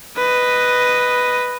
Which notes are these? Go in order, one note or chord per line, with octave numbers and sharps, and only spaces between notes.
B4 D#5